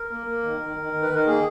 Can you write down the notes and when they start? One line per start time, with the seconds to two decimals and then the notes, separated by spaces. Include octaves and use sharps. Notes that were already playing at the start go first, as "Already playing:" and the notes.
Already playing: A#4
0.10 A#3
0.26 A#3
0.43 D#3
0.60 D#3
0.77 D#3
0.93 D#3
1.02 B4
1.10 D#3 A#4
1.26 A#3 G#4